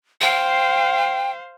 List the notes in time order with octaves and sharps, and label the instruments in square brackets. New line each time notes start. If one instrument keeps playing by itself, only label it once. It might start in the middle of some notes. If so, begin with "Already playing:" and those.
[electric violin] C5 F5 [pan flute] G5